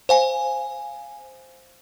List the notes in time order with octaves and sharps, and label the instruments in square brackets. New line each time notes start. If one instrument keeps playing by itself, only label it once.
[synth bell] C5 F5 G#5